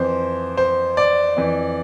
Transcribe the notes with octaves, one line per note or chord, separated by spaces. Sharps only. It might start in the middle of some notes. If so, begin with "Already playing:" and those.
Already playing: F2 E3 C5
C5
D5
F2 E3